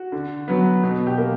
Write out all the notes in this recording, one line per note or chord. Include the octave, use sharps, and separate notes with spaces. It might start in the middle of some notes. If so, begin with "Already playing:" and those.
Already playing: F#4
D3
F#3 B3
B2
G4
A#3